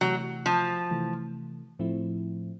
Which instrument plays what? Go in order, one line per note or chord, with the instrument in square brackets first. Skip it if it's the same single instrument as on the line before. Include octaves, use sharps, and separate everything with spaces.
[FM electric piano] C3 E3 A3 [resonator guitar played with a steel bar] F#3
[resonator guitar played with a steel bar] F3
[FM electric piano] C3 E3 A3
A2 F3 A3 C4 E4